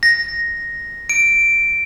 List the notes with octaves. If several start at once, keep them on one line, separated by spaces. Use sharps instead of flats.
A#6
D7